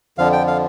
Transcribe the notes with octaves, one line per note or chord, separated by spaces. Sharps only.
F2 D3 F3 F5
G5
F5